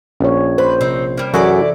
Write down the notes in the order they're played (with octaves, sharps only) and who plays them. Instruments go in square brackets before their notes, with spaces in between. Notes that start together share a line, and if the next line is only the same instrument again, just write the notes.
[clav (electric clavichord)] A#1 [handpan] C#4 C#5
[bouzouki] B4 [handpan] C5
[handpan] C3 [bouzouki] C4 D#4
[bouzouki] G3 A#3
[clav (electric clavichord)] F#2 F#4 G#4 [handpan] E3 [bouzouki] E4 A4 D5